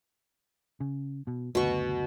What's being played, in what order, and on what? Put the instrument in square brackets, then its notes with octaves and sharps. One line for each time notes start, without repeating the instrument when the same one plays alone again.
[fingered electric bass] C#3
B2
[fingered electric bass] F#1 D2 [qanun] B2 C#6